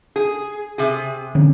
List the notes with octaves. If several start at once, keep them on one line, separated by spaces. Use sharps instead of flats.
G#4
C3 G#4
D3 C4 C#4